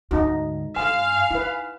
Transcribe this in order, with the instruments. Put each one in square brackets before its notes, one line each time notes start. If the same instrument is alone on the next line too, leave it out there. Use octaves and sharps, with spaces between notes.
[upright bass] D2 G#2 [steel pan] D#4 F#4
[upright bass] G2 [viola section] F5 [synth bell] G#5
[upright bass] D#4 [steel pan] E4 B4